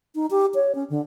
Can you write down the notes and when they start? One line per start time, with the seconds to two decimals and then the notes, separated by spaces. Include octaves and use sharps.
0.15 D#4
0.30 G4
0.55 C#5
0.75 C#4
0.90 D3